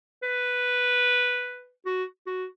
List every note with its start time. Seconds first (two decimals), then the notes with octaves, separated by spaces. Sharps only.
0.23 B4
1.86 F#4
2.27 F#4